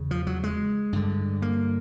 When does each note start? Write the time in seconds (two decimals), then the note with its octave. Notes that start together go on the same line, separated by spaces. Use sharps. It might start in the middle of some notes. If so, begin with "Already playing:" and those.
Already playing: E2 C#3
0.11 F3
0.27 F#3
0.44 G#3
0.93 G2 D3
1.42 A#3